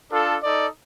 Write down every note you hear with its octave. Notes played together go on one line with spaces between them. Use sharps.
D4 F4 A4
D#4 A4 D5